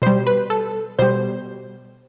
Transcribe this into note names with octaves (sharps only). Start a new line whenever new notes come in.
B2 G3 C5
B4
A4
B2 G3 C5